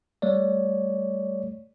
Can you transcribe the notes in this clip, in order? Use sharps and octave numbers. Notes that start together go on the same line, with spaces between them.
G3 A3 C#5 D5